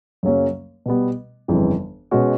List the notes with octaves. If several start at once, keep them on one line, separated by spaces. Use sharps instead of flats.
F#2 C#3 F#3 A#3 C#4
B2 G3 B3
G1 F2 C#3 E3
B2 G#3 C#4 F#4